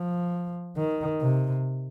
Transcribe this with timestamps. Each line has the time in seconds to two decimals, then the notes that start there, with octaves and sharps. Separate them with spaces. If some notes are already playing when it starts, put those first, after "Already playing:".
Already playing: F3
0.78 D#3
1.21 C3